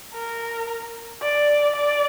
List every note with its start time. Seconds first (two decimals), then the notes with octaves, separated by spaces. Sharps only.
0.14 A#4
1.22 D5
1.76 D5